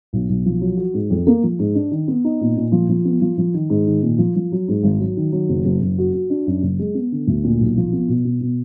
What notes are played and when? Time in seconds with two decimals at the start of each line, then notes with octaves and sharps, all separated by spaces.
0.13 B1
0.29 B1
0.46 F3
0.61 F#3
0.77 F#4
0.94 G#2
1.10 F2
1.27 A#3
1.43 F3
1.59 G#2
1.75 D4
1.91 D#3
2.08 B3
2.24 D#4
2.41 A#2
2.57 A#2
2.72 F3
2.89 F3
3.05 B3
3.21 F3
3.38 F3
3.54 D#3
3.70 G#2
3.87 D#3
4.02 A#2
4.18 F3
4.36 F3
4.52 F#3
4.68 G#2
4.83 G#1
5.00 F#3
5.17 D#3
5.32 F#3
5.49 F#1
5.65 F#1
5.81 F#1
5.98 F#4
6.14 F#4
6.30 D4
6.47 F#2
6.62 F#1
6.79 G#3
6.95 B3
7.12 D3
7.27 D2
7.44 A#2
7.60 B1
7.77 F3
7.93 B3
8.08 B2
8.25 B2
8.41 B2